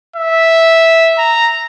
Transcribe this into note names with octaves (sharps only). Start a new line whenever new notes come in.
E5
A#5